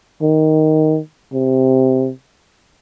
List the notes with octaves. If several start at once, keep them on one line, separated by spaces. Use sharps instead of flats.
D#3
C3